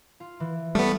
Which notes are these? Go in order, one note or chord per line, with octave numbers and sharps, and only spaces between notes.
F4
E3
G3 A3 B3